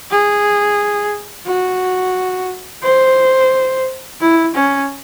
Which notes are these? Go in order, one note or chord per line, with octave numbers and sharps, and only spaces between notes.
G#4
F#4
C5
E4
C#4